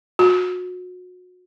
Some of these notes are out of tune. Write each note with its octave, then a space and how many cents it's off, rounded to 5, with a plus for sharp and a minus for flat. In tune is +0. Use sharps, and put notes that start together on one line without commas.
F#4 -35